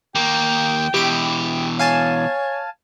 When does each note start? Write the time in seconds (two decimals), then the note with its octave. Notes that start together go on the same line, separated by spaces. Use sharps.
0.15 D#2 A#3 G5
0.94 B2 E3 G4 D7
1.79 C#5 F5 G#5 A5